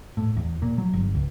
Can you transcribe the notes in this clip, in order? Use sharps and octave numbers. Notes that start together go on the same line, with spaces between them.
A2
E2
A#2
F#3
G1
C#2